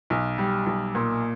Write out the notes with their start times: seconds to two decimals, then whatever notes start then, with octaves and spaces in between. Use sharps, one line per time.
0.10 B1
0.38 G3
0.66 B1
0.95 A#2